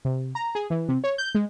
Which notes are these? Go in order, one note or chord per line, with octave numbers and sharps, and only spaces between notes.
C3
A#5
G#4
E3
C3
C#5
G6
G#3